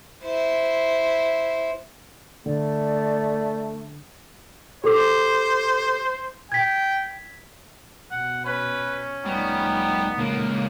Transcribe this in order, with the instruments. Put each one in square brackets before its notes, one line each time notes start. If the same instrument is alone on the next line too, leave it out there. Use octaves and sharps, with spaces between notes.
[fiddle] E4 C5
[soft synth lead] D3 [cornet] A3 [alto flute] D5
[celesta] G4 A4 D6 [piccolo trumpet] C5
[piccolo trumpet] G5 [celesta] G#6 B6
[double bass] B2 [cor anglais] F#5
[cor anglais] C#4 [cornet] B4
[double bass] F1 D#4 [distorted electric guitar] G3 [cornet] B3
[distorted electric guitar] C#2 A#3